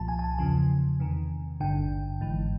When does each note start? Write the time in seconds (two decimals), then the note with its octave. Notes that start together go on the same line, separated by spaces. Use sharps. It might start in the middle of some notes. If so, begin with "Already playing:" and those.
Already playing: C2 A#2 F3 A5
0.08 G#5
0.19 G#5
0.24 A5
0.38 E2 C#3 F3 G#5
1.00 E2 C3 D#3
1.60 G#1 G2 D3 G5
2.21 G#1 G#2 E3